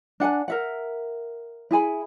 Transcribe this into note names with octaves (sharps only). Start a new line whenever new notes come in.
D4 F#5 G#5 A5
A#4 E5 F#5
E4 G#4 G#5 B5